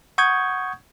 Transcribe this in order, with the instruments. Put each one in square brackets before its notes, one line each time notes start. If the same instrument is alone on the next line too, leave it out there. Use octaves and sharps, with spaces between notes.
[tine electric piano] F#5 C#6 D#6 G6 G#6